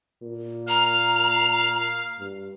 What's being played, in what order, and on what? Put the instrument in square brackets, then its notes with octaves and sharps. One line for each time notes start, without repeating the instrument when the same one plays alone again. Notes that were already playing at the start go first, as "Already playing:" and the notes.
[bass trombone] A#2
[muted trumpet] F5 [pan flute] A#5
[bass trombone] G2